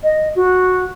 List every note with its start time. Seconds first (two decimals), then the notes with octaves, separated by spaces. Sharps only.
0.03 D#5
0.36 F#4